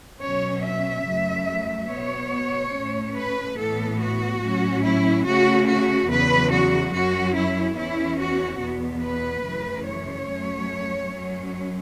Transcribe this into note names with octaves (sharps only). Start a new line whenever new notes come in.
B2 F#3 C#4 C#5
E5
F#2 C#3 F#3 A3
B2 B3 C#5
A2 A3 C#4
B4
A2 E3 B3 A4
F#4
A2 F#3 C#4
E4
C#3 A3 C#4 F#4
F#4
E2 C#3 F#3 B4
F#4
F#2 F#3 C#4 F#4
E4
E2 E3 C#4 E4
F#4
E2 B2 B3
B4
F#2 C#3 E3 A3
C#5
F#2 F#3 A3 C#4
F#2 F#3 C#4